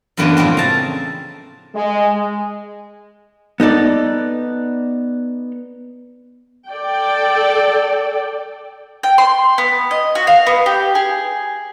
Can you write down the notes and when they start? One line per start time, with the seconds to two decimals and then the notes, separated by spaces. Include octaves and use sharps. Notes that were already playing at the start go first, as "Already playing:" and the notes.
0.17 F#2 A2 E3 A#3 B3 D4
0.37 C#3 F3 A#3 C4
0.57 E5 A5 A#5
1.75 G#3
3.60 B3 D#4 A4 D5
6.68 A4 D5 G5
9.03 G5
9.18 C6
9.58 B3
9.91 D#5
10.15 F#4
10.27 F5
10.47 B3
10.66 G4
10.95 G#4